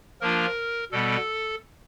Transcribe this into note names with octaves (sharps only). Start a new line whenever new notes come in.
F3 A#3 D4 F4 A#4
B2 G3 B3 A4